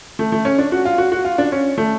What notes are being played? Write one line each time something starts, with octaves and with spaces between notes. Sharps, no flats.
A3
A3
C#4
D4
F#4
F4
F#4
F#4
F4
D4
C#4
A3